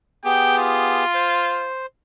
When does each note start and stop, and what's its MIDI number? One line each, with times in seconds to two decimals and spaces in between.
0.24 1.05 59
0.24 1.05 67
0.24 1.05 68
0.24 0.57 79
0.58 1.72 65
1.14 1.86 72